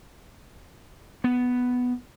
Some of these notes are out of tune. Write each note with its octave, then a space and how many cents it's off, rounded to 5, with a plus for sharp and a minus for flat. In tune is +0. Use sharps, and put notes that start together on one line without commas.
B3 +5